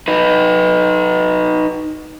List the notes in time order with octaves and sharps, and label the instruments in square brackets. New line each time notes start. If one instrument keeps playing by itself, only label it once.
[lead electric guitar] D#4 B4